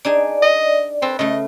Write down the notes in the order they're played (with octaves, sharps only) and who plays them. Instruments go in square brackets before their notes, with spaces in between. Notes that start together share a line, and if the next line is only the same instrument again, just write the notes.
[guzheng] D4 D#4 G#4 [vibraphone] D5
[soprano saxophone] D#5
[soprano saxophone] C4 [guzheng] A4 B4
[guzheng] C#3 A3 [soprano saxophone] D#5